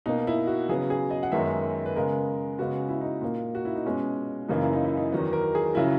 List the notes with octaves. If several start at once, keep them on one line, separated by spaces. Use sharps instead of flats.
B2 A#3 D#4
E4
F#4
C#3 F#3 B3 G#4
G#4
D#5
F#5
F#2 D#3 G#3 B3 E5
B4
C#3 G#3 B3 A#4
C#3 G#3 B3 F#4
E4
D#4
A#2 A#3
F#4
E4
D#4
B2 G#3 B3 C#4
F#2 C#3 E3 A#3 D#4
E4
D#4
E4
D#4
E2 D#3 F#3 B3
A#4
G#4
C#3 F#3 E4